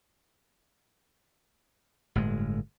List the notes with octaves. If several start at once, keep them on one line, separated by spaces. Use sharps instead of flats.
G1 A2 G#3